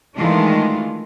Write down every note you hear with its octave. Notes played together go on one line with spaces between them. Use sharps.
D#3 E3 G#3 A3 D4 F4